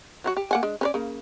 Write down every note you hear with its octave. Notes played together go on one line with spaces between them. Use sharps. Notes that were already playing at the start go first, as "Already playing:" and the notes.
F#3 C4 F#4
G4
A#3 F#5 G#5
G#3 D4
C#4 B4 D5
C#3 A#3